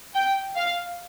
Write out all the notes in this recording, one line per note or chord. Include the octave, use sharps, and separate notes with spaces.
G5
F5